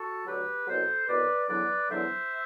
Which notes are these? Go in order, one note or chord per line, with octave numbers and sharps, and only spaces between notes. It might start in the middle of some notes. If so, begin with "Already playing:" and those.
Already playing: F#4 A4
D2 D3 F#3 G4 B4
C2 B2 F#3 A4 C5
C2 B2 F#3 B4 D5
E2 D3 F#3 B4 D5
E2 D3 F#3 C5 E5